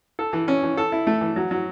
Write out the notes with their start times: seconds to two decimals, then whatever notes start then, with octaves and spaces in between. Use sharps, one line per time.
0.19 A4
0.33 E3
0.48 C#4
0.63 E3
0.77 A4
0.92 E4
1.07 A3
1.21 E3
1.36 F#3
1.51 F#3